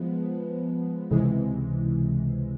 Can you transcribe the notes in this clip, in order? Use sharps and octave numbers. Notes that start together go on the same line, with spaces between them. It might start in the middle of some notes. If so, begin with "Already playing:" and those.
Already playing: F3 G#3 B3
C#2 C3 E3 G#3